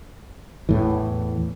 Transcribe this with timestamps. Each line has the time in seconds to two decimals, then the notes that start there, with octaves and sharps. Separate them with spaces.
0.69 E2 A2 E3